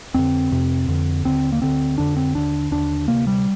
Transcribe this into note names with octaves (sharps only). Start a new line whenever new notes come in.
F2 D3 C4
F2 C3
F2 D3
D#2 D3 C4
A#3
D2 D3 C4
F2 D3 D4
C4
D#2 D3 D4
D#2 D3 D4
D2 C3 A#3
G3